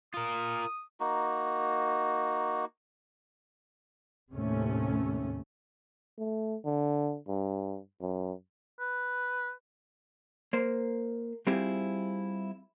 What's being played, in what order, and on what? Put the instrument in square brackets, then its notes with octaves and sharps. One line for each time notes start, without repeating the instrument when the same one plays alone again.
[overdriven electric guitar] F4 A#4 [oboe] D#6
[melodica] A#3 D#4 F#4
[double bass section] D#2 A2 C3 A3 C#4
[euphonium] A3
D3
G2
F#2
[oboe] B4
[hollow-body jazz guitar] A#3 C5
G3 C4 E4 F4 G4 G#4